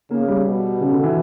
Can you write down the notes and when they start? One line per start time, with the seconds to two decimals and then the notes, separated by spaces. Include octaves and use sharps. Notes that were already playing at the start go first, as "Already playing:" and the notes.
0.11 C#3 A#3
0.28 G3
0.46 B2
0.80 C#3
0.92 D3
1.03 E3